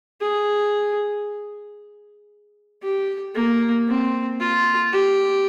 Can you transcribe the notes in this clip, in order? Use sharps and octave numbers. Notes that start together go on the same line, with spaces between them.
G#4
G4
A#3
C4
F4
G4